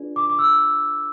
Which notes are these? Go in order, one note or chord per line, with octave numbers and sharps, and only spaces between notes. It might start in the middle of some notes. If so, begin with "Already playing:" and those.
Already playing: D4 F4 G#4 B4 D5
D6
D6
E6